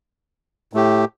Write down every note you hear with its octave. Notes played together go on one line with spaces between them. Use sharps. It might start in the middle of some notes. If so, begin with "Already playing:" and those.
A2 A3 G4